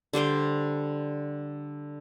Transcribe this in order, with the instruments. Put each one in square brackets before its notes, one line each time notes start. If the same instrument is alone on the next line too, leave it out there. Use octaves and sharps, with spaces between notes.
[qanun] D3 G3 C5 G5